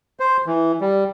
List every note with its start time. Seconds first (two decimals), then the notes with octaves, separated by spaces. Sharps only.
0.20 C5
0.46 E3
0.81 G3